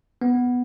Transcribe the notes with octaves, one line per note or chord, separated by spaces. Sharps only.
B3